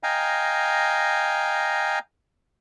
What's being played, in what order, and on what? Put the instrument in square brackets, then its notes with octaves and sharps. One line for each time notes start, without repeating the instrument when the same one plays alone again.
[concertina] D#5 F5 G5 G#5 A#5